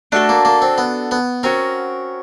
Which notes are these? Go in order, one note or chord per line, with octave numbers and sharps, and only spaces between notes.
A3 D4 F#4 A4
A#3
A#3
C4
B3
B3
C4 C#4 F#4 A#4